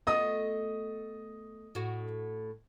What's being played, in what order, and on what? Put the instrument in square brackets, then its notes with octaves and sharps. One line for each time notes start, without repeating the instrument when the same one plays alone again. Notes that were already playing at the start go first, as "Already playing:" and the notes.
[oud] A3 B3 F4 [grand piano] D#5 D#6
[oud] A2 F#4